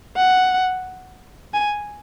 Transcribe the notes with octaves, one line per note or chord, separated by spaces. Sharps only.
F#5
G#5